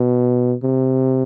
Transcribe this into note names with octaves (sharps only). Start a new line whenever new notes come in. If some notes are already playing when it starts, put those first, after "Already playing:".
Already playing: B2
C3